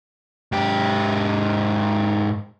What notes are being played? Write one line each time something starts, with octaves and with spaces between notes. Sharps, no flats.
G#2 G4